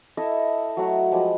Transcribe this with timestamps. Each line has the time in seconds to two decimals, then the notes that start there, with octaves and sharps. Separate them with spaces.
0.17 E4 A4 D#5 E5
0.77 F#3 A3 F#4
1.12 F3 G#3 G4 B5